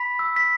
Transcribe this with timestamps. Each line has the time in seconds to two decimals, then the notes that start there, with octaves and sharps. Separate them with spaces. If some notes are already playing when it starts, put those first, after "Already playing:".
Already playing: B5 B6
0.19 E6
0.36 B6